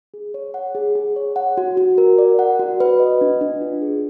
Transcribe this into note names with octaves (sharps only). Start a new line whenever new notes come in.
G#4
C#5
F#5
G#4
G#4
C#5
F#5
F#4
F#4
A#4
D5
F#5
F#4
B4
D#5
D4
D4
F4
G#4